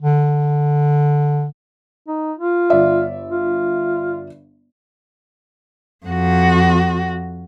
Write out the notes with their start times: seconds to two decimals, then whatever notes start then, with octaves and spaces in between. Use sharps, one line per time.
0.02 D3
2.08 D#4
2.38 F4
2.70 G1 D5 E5
3.29 F4
6.06 F2 F#4